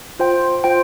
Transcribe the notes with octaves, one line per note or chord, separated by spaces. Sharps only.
F4 C5 G5
F4 C5 G5